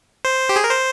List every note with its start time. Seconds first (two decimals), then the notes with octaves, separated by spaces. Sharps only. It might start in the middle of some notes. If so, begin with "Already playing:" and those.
0.25 C5
0.49 G4
0.56 G#4
0.64 A#4
0.71 C5